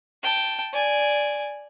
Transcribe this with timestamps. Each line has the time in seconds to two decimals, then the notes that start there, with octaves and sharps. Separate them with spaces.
0.23 G5 A5
0.73 D5 G#5